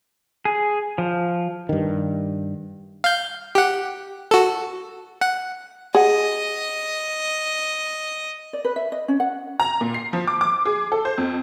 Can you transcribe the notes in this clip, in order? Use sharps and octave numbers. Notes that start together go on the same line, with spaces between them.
G#4
F3
G2 D#3
F5 G6
G4 F#5
F#4 A4
F#5
G#4 D#5 F#5
D5
B4
E5
D#5
C#4
F#5
A#5
A#2
C7
F3
D6
D6
G#4
A4
C5
F2